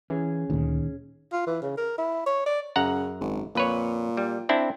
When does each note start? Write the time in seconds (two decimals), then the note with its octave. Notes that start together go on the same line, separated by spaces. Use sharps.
0.10 E3 C#4 G#4
0.50 D2 A#2 D#3
1.33 F4
1.47 E3
1.62 C#3
1.77 A#4
1.98 E4
2.26 C#5
2.46 D5
2.76 F#2 C#3 F#5 A#5
3.21 G#1
3.55 F2 A#2 B4 C#5
4.17 G3
4.49 C4 D4 E4